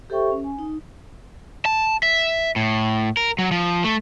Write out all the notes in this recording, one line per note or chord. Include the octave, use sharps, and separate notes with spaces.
G4 A4 C5 E5 G5 C#6
C#4
G#5
D#4
A5
E5
A2
A#4
F#3
F3
A3